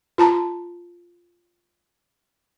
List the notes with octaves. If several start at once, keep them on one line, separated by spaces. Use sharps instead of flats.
F4 A5 A#5